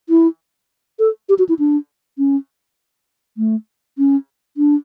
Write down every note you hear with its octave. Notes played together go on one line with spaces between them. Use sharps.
E4
A4
G4
F#4
E4
D4
C#4
A3
C#4
D4